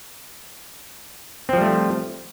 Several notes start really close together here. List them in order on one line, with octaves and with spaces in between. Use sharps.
C4 F3 G3 A3